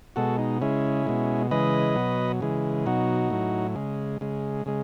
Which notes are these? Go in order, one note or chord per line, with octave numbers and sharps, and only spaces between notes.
B2 G#3 F#4 A4
D#4
C#3 G#3 C#4 E4
B2 G#3
C#3 E3 G#3 B4 D#5
B2 F#3
C#3 E3 G#3
B2 F#3 D#4 F#4
A2 F#3
C#3 G#3
C#3 G#3
C#3 G#3